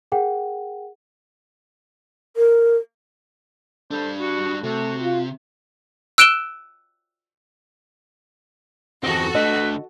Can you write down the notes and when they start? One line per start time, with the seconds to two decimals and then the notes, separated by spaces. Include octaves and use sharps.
0.12 G#4 A#4 F#5 G5
2.37 A#4
3.91 G3 D4 A4 C5
4.20 F#4
4.63 C3 A3 F#4
5.02 F4
6.18 E6 F#6 D7 E7 G7
9.04 E2 C4 F#4 G4 A4 D#5
9.35 D3 A3 B4 D#5